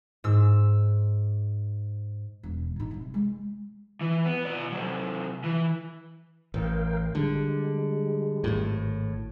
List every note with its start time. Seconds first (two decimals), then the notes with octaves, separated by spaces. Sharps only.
0.24 G#2 E6
2.43 E1
2.76 A2 D#4
2.91 C3 F#3
3.14 G#3
4.01 E3
4.26 B3
4.45 B2 D5
4.72 C3 F#3
5.44 E3
6.54 A1 A#4 F5 G5
7.15 D3 G3 G#3
8.44 G#1 A2